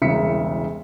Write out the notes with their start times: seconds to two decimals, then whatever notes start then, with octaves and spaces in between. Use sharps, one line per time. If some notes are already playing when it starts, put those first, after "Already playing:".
0.02 E1 C2 C#3 E5 B6 C#7